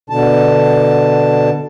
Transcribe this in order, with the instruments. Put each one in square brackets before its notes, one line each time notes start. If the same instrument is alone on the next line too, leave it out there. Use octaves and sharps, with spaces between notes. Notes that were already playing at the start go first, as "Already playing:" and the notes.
[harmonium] B2 D3 A5